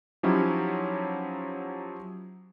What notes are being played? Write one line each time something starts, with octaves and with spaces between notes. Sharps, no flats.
F3 F#3 C#4 D#4 E4 G4